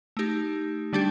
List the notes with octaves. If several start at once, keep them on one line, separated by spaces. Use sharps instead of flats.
A3 D#4 G4
D3 G3 D4 G4